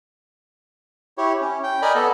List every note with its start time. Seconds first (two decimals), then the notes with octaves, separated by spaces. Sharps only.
1.18 E4 G4 C#5
1.41 C#4
1.64 G5
1.82 A#4 D5 D#5 G#5 B5
1.95 B3 A4